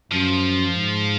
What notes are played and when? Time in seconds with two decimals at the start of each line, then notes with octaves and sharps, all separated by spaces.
0.11 F#2 F3
0.74 G#2